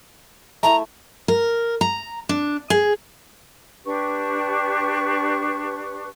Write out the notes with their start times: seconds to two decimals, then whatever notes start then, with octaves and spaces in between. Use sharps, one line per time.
0.63 A3 E4 A#5
1.28 A#4
1.81 A#5
2.29 D4
2.70 G#4
3.85 D4 G4 B4 C#6